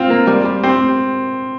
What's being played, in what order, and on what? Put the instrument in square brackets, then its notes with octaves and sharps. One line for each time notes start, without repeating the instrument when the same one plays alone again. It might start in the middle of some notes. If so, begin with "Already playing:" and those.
Already playing: [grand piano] C4 F4
[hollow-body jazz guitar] A#3
G3
G3
[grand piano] C4 [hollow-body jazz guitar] G4